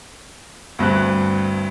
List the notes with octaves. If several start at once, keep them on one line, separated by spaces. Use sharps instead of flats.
D2 G2 C4 F#6